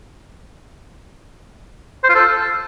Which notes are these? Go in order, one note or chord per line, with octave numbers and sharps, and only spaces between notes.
C5
F4
A4